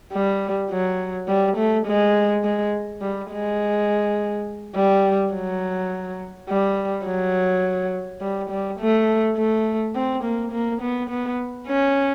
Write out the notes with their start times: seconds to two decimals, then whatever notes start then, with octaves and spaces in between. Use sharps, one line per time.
0.13 G3
0.71 F#3
1.28 G3
1.57 A3
1.87 G#3
2.43 G#3
3.01 G3
3.31 G#3
4.75 G3
5.33 F#3
6.49 G3
7.06 F#3
8.21 G3
8.50 G3
8.80 A3
9.36 A3
9.95 C4
10.24 A#3
10.52 A#3
10.82 B3
11.10 B3
11.68 C#4